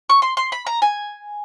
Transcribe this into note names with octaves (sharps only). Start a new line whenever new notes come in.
C#6
C6
C6
B5
A#5
G#5